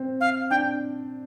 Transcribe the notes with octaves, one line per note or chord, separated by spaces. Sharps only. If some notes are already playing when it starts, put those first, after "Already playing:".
Already playing: C4
F5
D4 G5